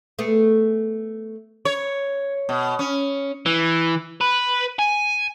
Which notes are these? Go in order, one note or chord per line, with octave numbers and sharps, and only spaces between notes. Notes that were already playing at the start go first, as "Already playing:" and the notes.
A3 B3 G#4
C#5
B2
C#4
E3
B4
G#5